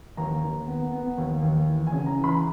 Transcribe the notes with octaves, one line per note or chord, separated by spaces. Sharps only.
D#2 A#5
D#2
B3
B3
D#2
D#2
E3
G#5
C#3
A#5
E3
B5